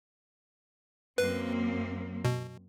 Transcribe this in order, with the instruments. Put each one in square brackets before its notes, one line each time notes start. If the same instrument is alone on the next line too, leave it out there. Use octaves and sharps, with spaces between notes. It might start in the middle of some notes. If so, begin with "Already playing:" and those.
[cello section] F#2 A#3 C4 [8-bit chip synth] B4
[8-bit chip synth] B2